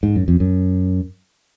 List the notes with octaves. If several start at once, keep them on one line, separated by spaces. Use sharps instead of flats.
G#2
F#2
F2
F#2